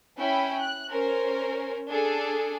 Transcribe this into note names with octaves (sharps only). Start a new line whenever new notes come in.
C#4 E4 G5 B5
F#6
C#4 A#4 C5
D4 G#4 A4